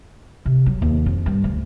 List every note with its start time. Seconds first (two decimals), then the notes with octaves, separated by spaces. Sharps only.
0.46 C3
0.66 F#3
0.82 D#2
1.06 F2
1.26 G2
1.44 D2